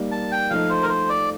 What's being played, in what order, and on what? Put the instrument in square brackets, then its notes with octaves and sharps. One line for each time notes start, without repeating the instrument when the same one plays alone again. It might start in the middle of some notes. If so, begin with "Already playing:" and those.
Already playing: [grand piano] G3 A#3 D#4 A#4
[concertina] A5
G5
[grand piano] F3 A3 D#4 [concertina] F5
[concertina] C5
A#4
C5
D5